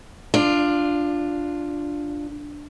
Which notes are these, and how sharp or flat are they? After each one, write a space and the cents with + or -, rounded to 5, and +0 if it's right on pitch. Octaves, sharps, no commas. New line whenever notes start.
D4 +0 F4 +0 D5 +25